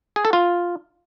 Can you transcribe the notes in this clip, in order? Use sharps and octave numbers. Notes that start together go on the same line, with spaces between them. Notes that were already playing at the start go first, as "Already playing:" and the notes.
G#4
A4
F4